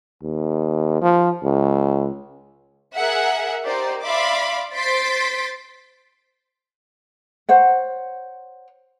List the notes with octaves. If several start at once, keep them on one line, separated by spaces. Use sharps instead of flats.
D#2
F3
C#2
G#4 A#4 E5 F#5
D#4 G4 A#4 C5 D5
D5 E5 F5 B5 C6 D6
C5 C6 A6 B6 D7
C5 C#5 F#5